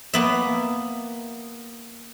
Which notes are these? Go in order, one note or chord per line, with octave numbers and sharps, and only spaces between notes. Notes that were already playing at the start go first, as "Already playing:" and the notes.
A#3 B3 E5